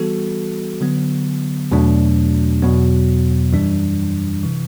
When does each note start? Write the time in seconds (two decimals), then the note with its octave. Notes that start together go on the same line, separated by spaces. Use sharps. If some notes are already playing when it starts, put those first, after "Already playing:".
Already playing: E3 G3 B3 F#4 A4
0.81 D3 F#3 B3
1.72 E2 B2 F#3 A3 D4
2.62 E2 B2 F#3 B3
3.53 F#2 E3 G3 D4
4.43 C3 E3